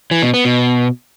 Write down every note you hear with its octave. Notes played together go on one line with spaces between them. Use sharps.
E3
B2
B3
B2